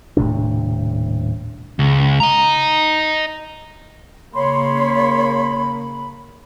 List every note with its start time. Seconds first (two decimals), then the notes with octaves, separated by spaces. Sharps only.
0.17 D#1 A2 C3 D4
1.79 C#2
2.20 D#5 A#5
4.34 C#3 A#3 C#5 B5 C6